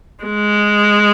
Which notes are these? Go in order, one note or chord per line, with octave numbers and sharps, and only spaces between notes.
G#3